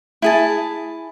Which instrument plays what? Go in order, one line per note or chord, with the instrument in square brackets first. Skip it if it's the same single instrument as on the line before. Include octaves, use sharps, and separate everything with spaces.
[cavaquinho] E4 G#4 A5